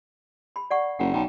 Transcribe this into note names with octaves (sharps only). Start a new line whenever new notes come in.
B5
D5 F#5 C#6
F#1 F#5
B1 G5